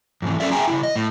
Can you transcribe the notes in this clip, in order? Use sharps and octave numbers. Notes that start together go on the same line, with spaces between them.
F2 G#2 E3
F#3 A3 C#4 A4 D5 E5
G#4 E5 G5 G#5 A#5
C#3 E3 E4
D#5
A2